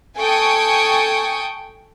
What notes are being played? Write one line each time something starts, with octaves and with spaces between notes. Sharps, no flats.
A4 G5 G#5 C#6 D#6